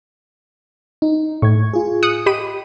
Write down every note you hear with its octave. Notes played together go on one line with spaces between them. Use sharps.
D#4
A2 C#6 G#6
F4 G#4
D#6 F#6 C#7
G4 D#5 B5 D#7